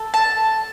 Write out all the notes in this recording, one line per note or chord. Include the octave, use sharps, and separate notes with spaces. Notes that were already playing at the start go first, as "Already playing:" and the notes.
Already playing: A4
A5